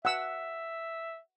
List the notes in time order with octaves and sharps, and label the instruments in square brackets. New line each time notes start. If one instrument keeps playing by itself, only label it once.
[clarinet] E5 [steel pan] F#5 E6